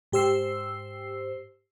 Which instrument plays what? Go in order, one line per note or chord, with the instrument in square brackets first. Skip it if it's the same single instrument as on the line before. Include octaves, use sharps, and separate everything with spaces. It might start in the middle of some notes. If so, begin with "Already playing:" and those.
[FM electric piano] G#2 G4 C5 E6 C7